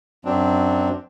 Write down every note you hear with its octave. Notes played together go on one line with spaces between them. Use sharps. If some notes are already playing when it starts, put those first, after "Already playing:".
F#2 F#3 C4 D4